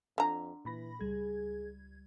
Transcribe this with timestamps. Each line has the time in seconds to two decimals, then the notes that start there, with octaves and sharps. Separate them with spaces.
0.18 F2 D3 A#5
0.65 A#2 E3 B5 A#6
1.01 C#2 G3 G#4 G#6